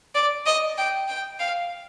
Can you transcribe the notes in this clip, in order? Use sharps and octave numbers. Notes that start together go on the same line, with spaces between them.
D5
D#5
G5
G5
F5